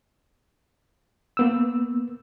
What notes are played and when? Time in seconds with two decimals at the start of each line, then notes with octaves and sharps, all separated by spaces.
1.37 A#3 B3 E6